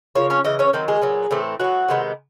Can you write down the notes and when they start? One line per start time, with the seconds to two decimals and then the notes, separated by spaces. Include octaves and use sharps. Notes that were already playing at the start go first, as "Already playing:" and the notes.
0.15 C#3 F3 A#3 C#5
0.30 C#4 C#5
0.45 C#3 E3 D#5
0.59 C#4 C#5
0.73 D#3 F#3 C4 C5
0.88 G#3 G#4
1.02 A#2 F#3 B3
1.31 A2 E3 A3 C4
1.60 E3 F#3 B3 F#4
1.88 C3 D#3 G#3 B3